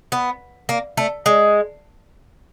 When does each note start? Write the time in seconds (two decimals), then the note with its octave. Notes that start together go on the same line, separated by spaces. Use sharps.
0.12 B3
0.69 A#3
0.97 A3
1.26 G#3